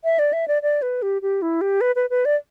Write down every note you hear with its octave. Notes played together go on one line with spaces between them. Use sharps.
E5
D5
E5
D5
D5
B4
G4
G4
E4
G4
B4
B4
B4
D5